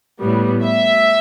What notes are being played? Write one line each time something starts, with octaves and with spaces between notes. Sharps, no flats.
A2 G3 B3
E5